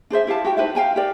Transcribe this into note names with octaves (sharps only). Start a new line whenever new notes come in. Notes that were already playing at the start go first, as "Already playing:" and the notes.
D4 G#4 C5 E5
E4 G4 F5 A5
F#4 G4 G5
D#4 B4 C5 E5
F5 G5 G#5 A#5
G4 A#4 D5